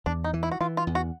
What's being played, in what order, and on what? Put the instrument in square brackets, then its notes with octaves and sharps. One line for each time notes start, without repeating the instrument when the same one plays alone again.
[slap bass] E2 [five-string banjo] D4
[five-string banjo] D#4
[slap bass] E3
[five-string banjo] E4
F#4
[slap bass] E3 [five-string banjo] F4
[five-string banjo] F4
[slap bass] E2
[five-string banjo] F#4